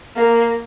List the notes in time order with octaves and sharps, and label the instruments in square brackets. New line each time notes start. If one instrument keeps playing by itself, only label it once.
[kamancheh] A#3